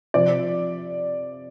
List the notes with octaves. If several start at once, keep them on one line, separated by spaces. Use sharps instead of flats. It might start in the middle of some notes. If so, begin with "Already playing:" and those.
C3 F3 C4 D5